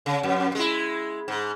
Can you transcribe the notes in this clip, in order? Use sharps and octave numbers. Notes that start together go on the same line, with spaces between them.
C#3
F2
G#3 E4
G#2